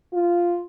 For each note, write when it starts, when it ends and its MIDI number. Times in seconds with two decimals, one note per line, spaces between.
0.13 0.63 65